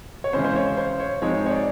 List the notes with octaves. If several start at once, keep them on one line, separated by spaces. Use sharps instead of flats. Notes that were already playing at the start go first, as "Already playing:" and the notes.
C#5
C#3 E3 G#3 C#4 C5
C5
C#5
C5
C#5
G#2 F3 G#3 C4 D#4 C#5
C#5
D5